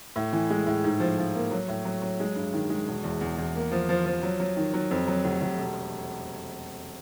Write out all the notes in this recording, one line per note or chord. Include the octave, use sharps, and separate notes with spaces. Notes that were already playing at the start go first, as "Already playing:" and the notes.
A2
E3
G#3
A2
G#2
F3
F3
A#3
F#3
A2
F#3
F#3
G#3
G2
D#3
G#3
E1
E2
E2
E2
A#3
F3
F3
F3
F#3
F#3
D#3
F#3
F2
F#3
F1
F1
E1